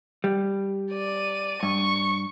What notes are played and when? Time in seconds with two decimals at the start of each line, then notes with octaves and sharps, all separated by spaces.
0.24 G3
0.92 D5 D#7
1.63 G2 C#6